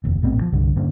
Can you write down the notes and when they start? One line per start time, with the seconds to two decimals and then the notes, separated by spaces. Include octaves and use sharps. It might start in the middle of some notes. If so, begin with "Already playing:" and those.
0.04 F1 D#2
0.22 A#1 A2 B3 C4
0.38 G2 F3
0.52 C2 G2 D3
0.76 G2 D3 A#3 C#4